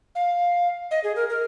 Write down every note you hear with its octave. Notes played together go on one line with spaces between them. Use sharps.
F5
D#5
G#4
A#4
A#4